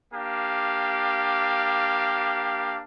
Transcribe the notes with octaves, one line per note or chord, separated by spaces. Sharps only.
A#3 D4 G4 F5